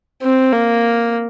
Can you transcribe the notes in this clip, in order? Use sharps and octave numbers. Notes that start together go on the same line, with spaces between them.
C4
A#3